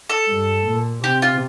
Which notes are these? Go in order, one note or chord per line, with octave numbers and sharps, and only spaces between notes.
A4
G2
A#2
C3 G4
F4